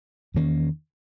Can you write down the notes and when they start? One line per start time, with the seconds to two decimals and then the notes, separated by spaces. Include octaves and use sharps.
0.34 E2 D#3 A#3 C#4